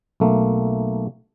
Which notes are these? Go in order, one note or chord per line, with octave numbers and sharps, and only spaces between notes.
B1 A3 A#3